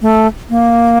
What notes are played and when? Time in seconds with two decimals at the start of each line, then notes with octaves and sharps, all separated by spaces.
0.02 A3
0.50 A#3